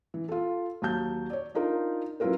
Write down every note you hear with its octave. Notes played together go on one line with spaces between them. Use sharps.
E3
F4 A4
D#2 F#3 A5 G6
C#5 D5
D4 D#4 F4 A#4
F#3 C#4 E4 F4 A#4 B4